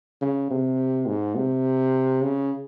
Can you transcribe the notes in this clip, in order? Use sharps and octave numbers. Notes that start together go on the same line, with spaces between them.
C#3
C3
G#2
C3
C#3